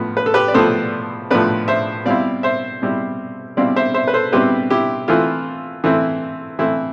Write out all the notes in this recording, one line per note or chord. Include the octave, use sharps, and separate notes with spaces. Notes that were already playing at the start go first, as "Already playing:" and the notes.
Already playing: A2 F3 B3
B4
A4
G4 B4
D5
A2 F3 B3 A4 C5
A2 F3 B3 B4 D5
C5 E5
B2 G3 C4 E4 D5 F5
C5 E5
B2 G3 C4 E4
B2 G3 C4 E4 D5 F5
C5 E5
C5 E5
B4
A4 C5
B2 G3 C4 E4 G4 B4
E4 G4
E3 A3 C4 E4 F4
E3 A3 C4 E4
E3 A3 C4 E4